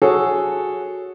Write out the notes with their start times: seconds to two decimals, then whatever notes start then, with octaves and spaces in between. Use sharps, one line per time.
0.02 F#4 G#4 A4 C#5